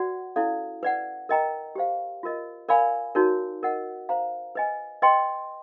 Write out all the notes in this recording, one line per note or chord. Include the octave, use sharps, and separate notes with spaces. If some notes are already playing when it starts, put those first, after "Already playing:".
Already playing: F#4 B4 D5 F#5
C#4 E4 A4 D5 F5
B4 D5 F#5
A#4 D#5 G5 A#5
G4 C5 F5
F4 A#4 D#5
A#4 D5 F5 G#5 B5
D#4 F#4 A#4 C#5
A#4 D#5 F#5
C5 F5 A#5
B4 D#5 G#5
B4 D#5 G5 C6